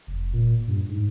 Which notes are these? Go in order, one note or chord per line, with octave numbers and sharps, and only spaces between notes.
F1
A#2
G2
G#2